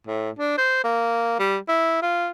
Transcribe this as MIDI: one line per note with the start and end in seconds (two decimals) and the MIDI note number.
0.07 0.30 45
0.39 0.56 62
0.58 0.83 72
0.84 1.37 58
1.39 1.57 55
1.68 1.99 64
2.02 2.29 65